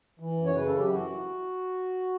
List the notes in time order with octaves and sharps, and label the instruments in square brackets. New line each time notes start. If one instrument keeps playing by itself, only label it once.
[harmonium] E3
F#2
C#5
C#3 B4
F#2 A4
G4
E3 F#4